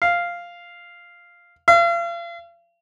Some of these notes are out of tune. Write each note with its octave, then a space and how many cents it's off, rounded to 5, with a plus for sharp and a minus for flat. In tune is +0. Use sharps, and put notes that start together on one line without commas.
F5 -5
F5 -40